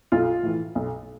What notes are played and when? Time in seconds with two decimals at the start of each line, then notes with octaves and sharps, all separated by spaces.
0.12 B1 F4
0.43 A2 E3
0.75 B1